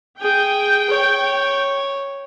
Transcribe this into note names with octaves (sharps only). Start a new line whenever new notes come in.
G#4 G5
C#5